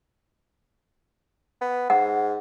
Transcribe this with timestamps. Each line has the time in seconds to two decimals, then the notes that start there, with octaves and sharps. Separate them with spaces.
1.61 B3
1.90 G#2 F#5